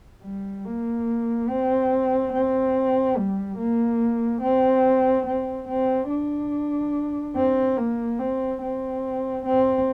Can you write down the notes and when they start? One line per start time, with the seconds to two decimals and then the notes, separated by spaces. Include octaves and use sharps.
0.23 G3
0.65 A#3
1.49 C4
2.33 C4
3.17 G3
3.58 A#3
4.42 C4
5.26 C4
5.68 C4
6.10 D4
7.36 C4
7.77 A#3
8.19 C4
8.62 C4
9.45 C4